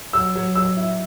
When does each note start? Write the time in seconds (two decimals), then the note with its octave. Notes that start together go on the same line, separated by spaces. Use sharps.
0.13 F#3 E6
0.36 F#3
0.55 F#3 E6
0.77 E4